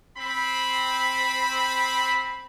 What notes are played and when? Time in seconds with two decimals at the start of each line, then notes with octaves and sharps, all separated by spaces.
0.17 C4 B5